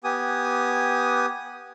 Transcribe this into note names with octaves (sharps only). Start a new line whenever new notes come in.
B3 G4 G#5 D#6